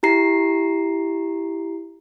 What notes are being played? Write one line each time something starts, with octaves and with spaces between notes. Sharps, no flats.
E4 G4 A#5 C7